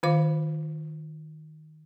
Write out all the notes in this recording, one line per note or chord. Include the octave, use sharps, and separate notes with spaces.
D#3 F4 C5 F5 D6